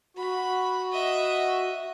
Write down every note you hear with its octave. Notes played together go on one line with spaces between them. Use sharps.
F#4 B5
D#5 E5